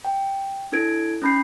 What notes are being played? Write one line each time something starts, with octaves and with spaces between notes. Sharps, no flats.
G5
D4 E4 A4 G#6 D7
C#4 D#4 B5 G6 C7